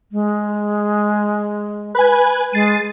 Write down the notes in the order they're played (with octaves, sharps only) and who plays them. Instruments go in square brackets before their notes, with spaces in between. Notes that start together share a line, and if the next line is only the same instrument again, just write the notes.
[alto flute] G#3
[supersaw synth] B4 G#5
[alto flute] G#3 [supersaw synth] A6 C7 D#7